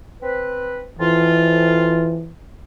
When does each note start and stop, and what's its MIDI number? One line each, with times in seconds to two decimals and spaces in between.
0.22 0.83 60
0.22 0.83 71
0.99 2.22 41
0.99 2.33 52
0.99 2.22 65